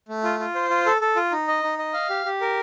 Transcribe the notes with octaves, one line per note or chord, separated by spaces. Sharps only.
A3
F4
F4
C5
F4
A4
A4
F4
D#4
D#5
D#4
D#5
F5
G4
G4
A#4